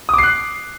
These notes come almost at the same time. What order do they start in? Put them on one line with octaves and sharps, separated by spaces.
D#6 D6 C7 F#6